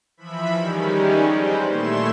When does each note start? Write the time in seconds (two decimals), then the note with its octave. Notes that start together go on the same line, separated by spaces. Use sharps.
0.17 E3 F3 E5 B5
0.52 D#3 G3 G#3 C#4
1.28 G3 C4 B4 C5
1.67 A#2 A3 E4 C#5 C6 E7